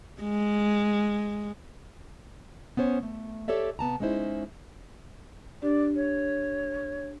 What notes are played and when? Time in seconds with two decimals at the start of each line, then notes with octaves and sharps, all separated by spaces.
0.22 G#3
2.77 B3 C#4 C5 C#5
3.03 A3
3.48 G4 A4 C#5 D5 E5
3.79 C3 B3 A5 A#5
4.00 G#3 C#4 D#4 E4 C5
5.62 D4 G4 D5
5.95 C#5